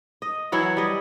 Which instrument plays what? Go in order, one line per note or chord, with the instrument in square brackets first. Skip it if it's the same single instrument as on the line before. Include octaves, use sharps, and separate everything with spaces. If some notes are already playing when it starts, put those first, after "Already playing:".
[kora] D#5
E3 F#3 E4 C#5
G3 D#5